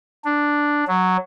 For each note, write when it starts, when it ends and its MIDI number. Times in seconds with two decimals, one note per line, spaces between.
0.25 0.84 62
0.87 1.17 54